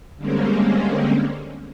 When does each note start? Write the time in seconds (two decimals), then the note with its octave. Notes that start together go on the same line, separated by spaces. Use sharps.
0.18 D3 G3 G#3 A#3 C4 C#4